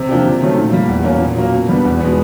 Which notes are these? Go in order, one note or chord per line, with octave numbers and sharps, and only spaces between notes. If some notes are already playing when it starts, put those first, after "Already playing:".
Already playing: C3
F3 A#3 D4 G4
C3
D#3 F#3 A3 C#4
A#2
G3 A#3
E2
B2 F#3 A#3 C#4
A#2
F#3 A#3 C#4
B2
G3 B3 D4
E2
B2 G#3 B3